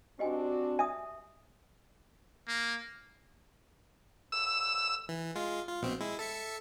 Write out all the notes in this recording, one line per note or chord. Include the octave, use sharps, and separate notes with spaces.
C4 D4 F#4 G4 D#5 G#5
E5 G#5 D#6
A#3
E6
E3
G#3 F4
F4
A#1 B2 C4
G#3 E4
A4 E5 C#7